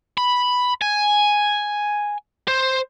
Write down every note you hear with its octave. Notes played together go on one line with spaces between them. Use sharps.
B5
G#5
C5